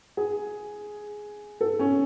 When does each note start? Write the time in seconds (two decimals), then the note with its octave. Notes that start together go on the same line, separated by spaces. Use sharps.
0.17 G#4
1.61 A4
1.79 C#4